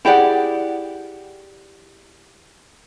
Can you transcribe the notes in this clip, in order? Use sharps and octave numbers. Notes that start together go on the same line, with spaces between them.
E4 G4 G#4 D5 F#5